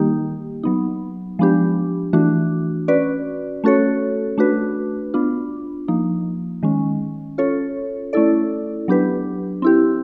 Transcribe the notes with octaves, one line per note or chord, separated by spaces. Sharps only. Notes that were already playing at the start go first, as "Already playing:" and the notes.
Already playing: D#3 G3 A#3 D#4 G4
F#3 B3 D#4
F3 G#3 B3 D4 G4
E3 A3 D4 F#4
C#4 F#4 B4 D5
A3 C#4 F#4 A4 C#5
A3 D4 F#4 B4
B3 D4 F4
F3 A#3 D#4
D#3 G#3 C#4
C#4 F4 A4 C#5
A3 C#4 E4 A4 D5
F#3 B3 D4 G4 B4
C4 E4 G4